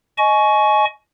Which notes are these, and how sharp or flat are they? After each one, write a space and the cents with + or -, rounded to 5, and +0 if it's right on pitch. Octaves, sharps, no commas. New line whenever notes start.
D#5 +0 G#5 +30 C#6 +5